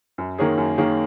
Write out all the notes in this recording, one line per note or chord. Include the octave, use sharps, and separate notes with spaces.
F#2
D#3 A#3 C#4 G#4
F#2
D#3 A#3 C#4 G#4